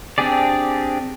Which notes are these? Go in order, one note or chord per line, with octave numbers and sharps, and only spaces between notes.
C4 D4 G4 G#4 D5